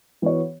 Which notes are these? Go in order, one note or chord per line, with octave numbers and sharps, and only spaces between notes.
E3 B3 F#4 C#5